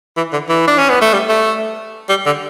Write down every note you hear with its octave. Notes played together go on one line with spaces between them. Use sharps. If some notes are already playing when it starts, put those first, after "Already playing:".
E3
D3
E3
D4
C#4
B3
A3
G3
A3
G3
D3